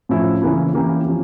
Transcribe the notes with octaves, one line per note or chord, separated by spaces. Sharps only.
A2 F3 C#4 E4
C#3 E3 A#3 C#4 E4
E3 A#3 C#4 E4 G4
F3 C#4